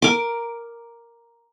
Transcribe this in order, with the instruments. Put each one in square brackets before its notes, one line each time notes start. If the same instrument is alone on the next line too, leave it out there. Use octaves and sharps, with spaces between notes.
[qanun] A#4 D6